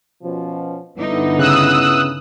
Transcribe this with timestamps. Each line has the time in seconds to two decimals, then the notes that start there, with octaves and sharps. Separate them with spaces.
0.23 B2 F3 C#4
0.98 G2 D3 B3 D#4 E4
1.39 C#3 D#6 E6 F#6